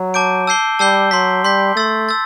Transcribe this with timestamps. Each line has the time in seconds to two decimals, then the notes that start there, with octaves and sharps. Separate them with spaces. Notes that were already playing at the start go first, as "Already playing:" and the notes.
Already playing: F#3
0.14 A5 D6 G6 D7
0.47 A5 E6 G6 C7 G7
0.79 G3 A5 E6 G6 C7 G7
1.11 F#3 C6 G6 B6
1.44 G3 C6 G6 B6
1.76 A3 C6 E6 A6
2.09 E6 A6